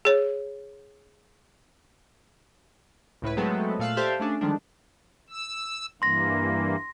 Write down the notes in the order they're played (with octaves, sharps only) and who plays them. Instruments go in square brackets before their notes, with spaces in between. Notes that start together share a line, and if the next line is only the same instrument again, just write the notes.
[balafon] G#4 C#5
[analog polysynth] C#2 A2 E4 B4
F#3 G#3 A3 B3 C4 A4
A#2 A3 F5 E6 F#6
G4 A4 C5 D5 E5 F5
A3 C#4 D4 G#4
D3 D#3 F3 G3 G#3 D4
[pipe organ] E6
[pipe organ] G2 E3 A#3 [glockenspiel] C6 A#6